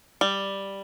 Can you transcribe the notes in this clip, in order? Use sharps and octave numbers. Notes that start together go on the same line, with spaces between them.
G3